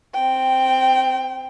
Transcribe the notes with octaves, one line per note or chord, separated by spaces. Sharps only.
C4 G5